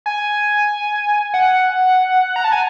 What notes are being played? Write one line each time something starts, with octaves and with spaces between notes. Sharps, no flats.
G#5
F#5
A#5
A5
G#5